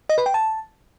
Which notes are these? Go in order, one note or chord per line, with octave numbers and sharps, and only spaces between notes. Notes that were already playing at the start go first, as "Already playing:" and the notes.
D#5
B4
G5
A5